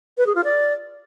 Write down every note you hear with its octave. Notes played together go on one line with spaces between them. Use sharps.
B4
G#4
F4
D5